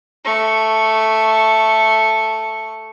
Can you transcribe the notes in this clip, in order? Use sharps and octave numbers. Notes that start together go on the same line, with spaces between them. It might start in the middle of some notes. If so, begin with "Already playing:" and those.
A3 C#6